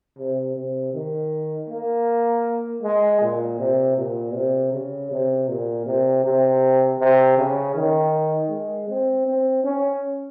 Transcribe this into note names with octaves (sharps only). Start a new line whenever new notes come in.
C3
C3
D#3
A#3
G#3
A#2
C3
A#2
C3
C#3
C3
A#2
C3
C3
C3
C#3
D#3
G#3
C4
C4
C#4